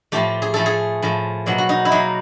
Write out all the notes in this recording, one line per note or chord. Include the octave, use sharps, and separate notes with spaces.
A2 F3 A3 G4
G#4
A2 F3 A3 A4
G#4
A2 F3 A3
B2 F#3 A#3
F#4
D#4
E4
B2 F#3 A#3 D#4